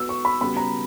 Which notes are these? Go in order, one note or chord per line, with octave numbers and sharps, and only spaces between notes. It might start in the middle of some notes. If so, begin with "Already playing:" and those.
Already playing: B3 F#4 B4 E6
C#6
B5
C#3 G3 B3 F#4 B5
A#5